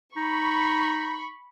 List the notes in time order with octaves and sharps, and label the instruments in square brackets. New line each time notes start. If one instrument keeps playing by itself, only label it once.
[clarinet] D#4 [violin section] B5 C#6